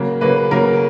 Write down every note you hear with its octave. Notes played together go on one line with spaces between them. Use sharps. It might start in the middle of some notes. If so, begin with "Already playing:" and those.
Already playing: C#3 F#3 A#3
C#3 F#3 A#3 B4
C#3 F#3 A#3 A#4